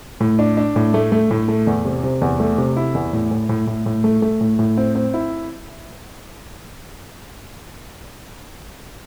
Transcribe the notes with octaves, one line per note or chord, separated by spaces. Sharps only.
A2
D4
D4
A2
A3
A3
A2
A3
E2
C3
C3
E2
A3
C3
E4
E2
A2
A2
A2
A2
A2
A3
A3
A2
A2
C4
C4
E4